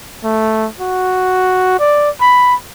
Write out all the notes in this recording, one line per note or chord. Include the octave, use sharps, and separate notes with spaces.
A3
F#4
D5
B5